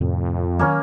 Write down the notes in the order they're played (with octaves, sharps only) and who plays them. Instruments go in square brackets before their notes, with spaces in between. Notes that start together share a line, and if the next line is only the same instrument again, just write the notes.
[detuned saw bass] F2 [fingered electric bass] A2 C3
[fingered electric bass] D#3 F#3 [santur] A#3 C#4